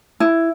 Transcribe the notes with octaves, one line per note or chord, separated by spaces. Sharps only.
E4